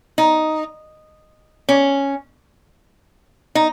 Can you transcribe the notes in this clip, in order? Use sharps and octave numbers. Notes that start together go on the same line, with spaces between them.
D#4
C#4
D#4